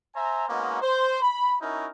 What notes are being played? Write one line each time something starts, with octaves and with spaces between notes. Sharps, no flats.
C5 E5 G#5 A#5
G#3 A#3 B3 C#4 D#4 F#4
C5
B5
C#4 D#4 E4 F#4 A#4